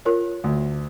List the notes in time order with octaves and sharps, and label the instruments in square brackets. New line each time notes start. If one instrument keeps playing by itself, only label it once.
[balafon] F4 A#4 C#5
[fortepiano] D2